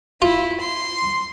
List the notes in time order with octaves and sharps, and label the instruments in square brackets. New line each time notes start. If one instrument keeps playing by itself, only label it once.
[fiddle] E4 [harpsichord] F4
[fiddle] C6